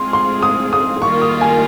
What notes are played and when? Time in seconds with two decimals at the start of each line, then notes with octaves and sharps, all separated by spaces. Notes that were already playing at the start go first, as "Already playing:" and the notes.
Already playing: G#3 C4 F4 G#4 C6
0.13 C6
0.42 D#6
0.73 D#6
1.02 D#3 G3 A#3 F4 A#4 C#6
1.22 D#6
1.41 G#5